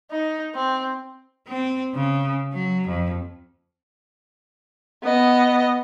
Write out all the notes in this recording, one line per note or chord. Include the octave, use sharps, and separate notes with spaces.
D#4
C4
C4
C#3
F#3
F2
B3 D#5